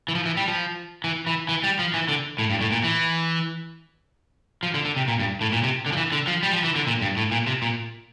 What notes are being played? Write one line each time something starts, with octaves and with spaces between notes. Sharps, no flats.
E3
F3
E3
G3
F3
E3
E3
E3
G3
F3
E3
D3
A2
G2
A2
A#2
E3
F3
D3
D3
C3
A#2
G2
A2
A#2
C3
D3
F3
E3
D3
F3
G3
F3
E3
D3
A#2
G2
A2
A#2
C3
A#2